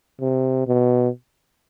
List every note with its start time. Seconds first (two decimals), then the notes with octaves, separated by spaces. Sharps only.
0.21 C3
0.67 B2